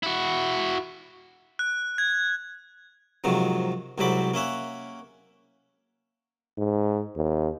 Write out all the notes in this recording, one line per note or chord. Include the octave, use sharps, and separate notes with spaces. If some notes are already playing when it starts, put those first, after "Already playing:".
E4 F#4
F#6
G#6
G#2 C3 D#3 F3 F#3
C2 G#2 C3 F#3 G4 B5
A#3 C#4 E5 F#5
G#2
D#2